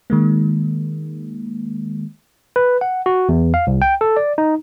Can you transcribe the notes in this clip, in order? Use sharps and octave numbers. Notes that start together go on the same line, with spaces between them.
D#3 G#3 A#3
B4
F#5
F#4
E2
F5
C2
G5
A4
D5
D#4